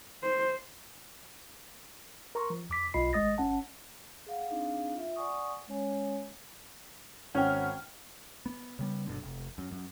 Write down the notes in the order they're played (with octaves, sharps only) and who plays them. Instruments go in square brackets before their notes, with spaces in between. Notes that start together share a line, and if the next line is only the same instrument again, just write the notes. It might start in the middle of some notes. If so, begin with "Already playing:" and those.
[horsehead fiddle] C5
[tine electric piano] A#4 A#5 C6 C#6
F3
F2 D6 B6
B1 F4 D#5 B5 C7
G#1 G#3 D#5 D#6 A6 A#6
G1 C#4 F#5 A5
[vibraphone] G#4 F5 F#5
C4 D4 D#4 G#4 F5
F4 E5
D5 F#5 G#5 C#6 D#6
G#3 C#4 C#5 G#5
[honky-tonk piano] G#1 C#4 F6 [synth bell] F#5 G5
[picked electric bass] B3
C#3 G3 B3
G1 F#2 B2 D3
F1
F#2
F#2